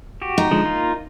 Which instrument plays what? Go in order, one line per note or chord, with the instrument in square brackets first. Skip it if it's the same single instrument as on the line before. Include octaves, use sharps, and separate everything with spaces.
[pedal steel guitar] F#4 G4
[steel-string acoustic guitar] D#4
[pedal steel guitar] D3 F3 G#3
A#3 F4